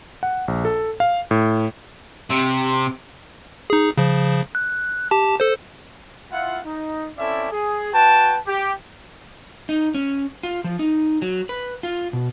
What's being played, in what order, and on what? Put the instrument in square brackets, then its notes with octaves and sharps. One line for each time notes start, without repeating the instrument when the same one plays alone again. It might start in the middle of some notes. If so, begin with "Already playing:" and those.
[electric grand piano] F#5
A#1
A4
F5
A2
[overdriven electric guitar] C3
[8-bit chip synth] D#4 G#4
C#3 F3
F#6
G4 A5
A4 C5
[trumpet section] E4 F4 F#5
D#4
C4 C#4 E4 A4 D5 E5
G#4
F#4 B4 G5 A5
G4
[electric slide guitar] D#4
C#4
F4
F3
D#4
F#3
B4
F4
B2